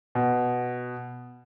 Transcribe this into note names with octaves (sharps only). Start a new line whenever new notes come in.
B2